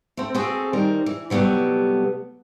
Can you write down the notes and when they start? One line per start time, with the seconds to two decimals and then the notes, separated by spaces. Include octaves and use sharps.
0.17 A3 C4
0.35 C4 F#4 G#4 A4 F5
0.73 D#3 G3 A#4 C5
1.06 E3
1.30 C3 F#3 G3 A3 B3